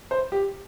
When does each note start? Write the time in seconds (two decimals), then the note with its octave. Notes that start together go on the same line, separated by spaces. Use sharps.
0.11 C5
0.32 G4